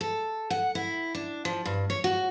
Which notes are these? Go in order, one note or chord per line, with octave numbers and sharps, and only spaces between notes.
A4
F#5
E4
D4
F3
G2
C#5
F#4